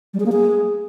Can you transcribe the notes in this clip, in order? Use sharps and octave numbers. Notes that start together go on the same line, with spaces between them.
G3
G#4
A#3
G#4